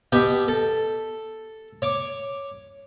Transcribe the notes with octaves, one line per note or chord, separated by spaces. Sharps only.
B2 G4 G5
A4
C#5 D6